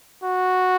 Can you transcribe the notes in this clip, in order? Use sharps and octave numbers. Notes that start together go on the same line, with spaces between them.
F#4